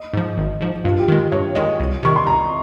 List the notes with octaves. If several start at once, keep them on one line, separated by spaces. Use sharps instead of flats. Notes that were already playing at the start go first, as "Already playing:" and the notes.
Already playing: D#5
G#2 F3
G#1
G#2 F3
G2 F4
G4
D#3 G#3
G2 C#5
D#3 G#3 D#5
C2
C3 D#3 C#6
C6
C2 A#5